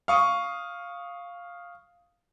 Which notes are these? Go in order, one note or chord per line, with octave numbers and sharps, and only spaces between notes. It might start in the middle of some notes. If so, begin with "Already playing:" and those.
F5 C#6 D#6